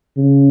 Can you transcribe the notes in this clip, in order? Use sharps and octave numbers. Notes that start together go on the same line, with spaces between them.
C#3